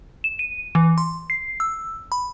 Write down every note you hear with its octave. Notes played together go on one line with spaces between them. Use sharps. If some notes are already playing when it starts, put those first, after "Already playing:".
E7
D#7
E3
C6
C7
E6
B5